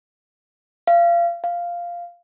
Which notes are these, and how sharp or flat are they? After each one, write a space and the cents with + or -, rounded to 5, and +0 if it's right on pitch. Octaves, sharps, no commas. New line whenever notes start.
F5 -30
F5 -5